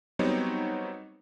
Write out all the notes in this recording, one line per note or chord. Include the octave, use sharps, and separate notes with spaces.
F#3 G3 B3 C4 D#4 C#5